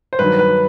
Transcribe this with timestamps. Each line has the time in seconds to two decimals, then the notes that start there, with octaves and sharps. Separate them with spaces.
0.13 C5
0.19 G2 D#3 F#3 B4
0.39 B4